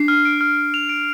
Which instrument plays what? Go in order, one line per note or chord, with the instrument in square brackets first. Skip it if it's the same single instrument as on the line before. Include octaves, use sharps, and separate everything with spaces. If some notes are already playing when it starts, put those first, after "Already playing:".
Already playing: [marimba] D4 [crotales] C7
[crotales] F6
D7
F6
F6
F7
D7